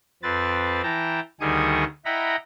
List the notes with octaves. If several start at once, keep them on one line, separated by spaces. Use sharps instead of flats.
F2 C4 B4 A6
E3 G5 A5 A#5
D2 D#3 G3 G#4 C#6 D#6
E4 D#5 F#5 G5 A#5 B5